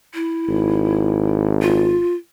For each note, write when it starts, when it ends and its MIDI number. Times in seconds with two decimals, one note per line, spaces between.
0.14 1.46 64
0.48 2.00 32
1.62 2.14 65